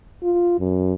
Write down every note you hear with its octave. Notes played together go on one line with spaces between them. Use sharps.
F4
F#2